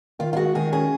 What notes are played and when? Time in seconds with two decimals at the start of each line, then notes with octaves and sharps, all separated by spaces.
0.19 D#3 F4
0.33 F4
0.37 G#3 F#4
0.55 D#3 G#4
0.72 C#4 G#4